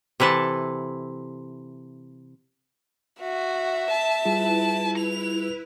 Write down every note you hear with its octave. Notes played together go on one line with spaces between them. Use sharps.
C3 E3 E4 A4 A5
F#4 E5
A5
G3 E4 F4 G#4 B4
F7